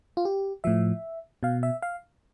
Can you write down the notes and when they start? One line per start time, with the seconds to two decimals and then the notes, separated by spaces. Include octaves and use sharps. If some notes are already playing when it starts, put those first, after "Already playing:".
0.17 F4
0.25 G4
0.64 A2 F3 E5
1.43 B2 F5
1.63 E5
1.82 F5